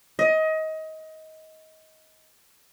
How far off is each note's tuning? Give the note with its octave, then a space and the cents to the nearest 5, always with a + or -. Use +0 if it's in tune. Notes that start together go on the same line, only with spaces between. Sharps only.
D#5 +25